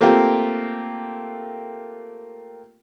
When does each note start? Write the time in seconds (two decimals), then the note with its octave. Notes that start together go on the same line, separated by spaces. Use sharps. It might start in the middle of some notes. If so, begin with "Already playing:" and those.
0.01 A3 A#3 C4 F4 G4 A#4